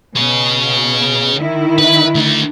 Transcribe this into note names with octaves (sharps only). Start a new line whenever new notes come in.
B2 G#4 C#5
D#3 E4
B4
D3 A3